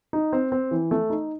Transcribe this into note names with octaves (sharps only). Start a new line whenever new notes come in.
D#4
C4
C4
E3
A3
D#4